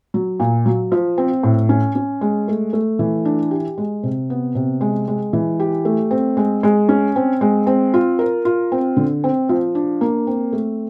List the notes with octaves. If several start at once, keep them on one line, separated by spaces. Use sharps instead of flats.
F#3
A#2
F#3
F3
C4
A2
C#4
C#4
G#3
A3
A3
E3
D4
G4
G#3
C3
B3
C3
G#3
G#3
E3
G4
A3
C4
G#3
G#3
C#4
C4
G#3
C4
F4
A#4
F4
C4
D3
C4
F3
D4
A#3
C4
A3